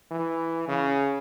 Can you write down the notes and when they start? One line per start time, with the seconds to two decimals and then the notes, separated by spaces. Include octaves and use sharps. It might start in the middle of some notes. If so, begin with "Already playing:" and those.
0.11 E3
0.68 C#3